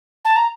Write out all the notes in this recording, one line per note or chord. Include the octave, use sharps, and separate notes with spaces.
A5
A#5